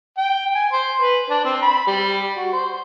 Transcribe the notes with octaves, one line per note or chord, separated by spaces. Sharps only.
G5
G#5
C5
B4
D4
C4
B5
G3
F#4
C5